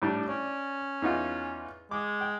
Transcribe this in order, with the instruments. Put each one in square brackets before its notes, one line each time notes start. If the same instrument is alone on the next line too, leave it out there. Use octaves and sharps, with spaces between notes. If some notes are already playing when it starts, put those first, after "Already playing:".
[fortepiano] A2 G3 D4
[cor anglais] C#4 [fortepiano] D5
[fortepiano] E2 D#4 F4
[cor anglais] G#3 [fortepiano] D6
[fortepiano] G5